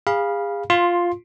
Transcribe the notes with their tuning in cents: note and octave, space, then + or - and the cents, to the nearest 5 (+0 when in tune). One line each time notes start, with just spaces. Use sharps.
G#4 -35 F5 +0 B5 -25
F4 +0 C6 +15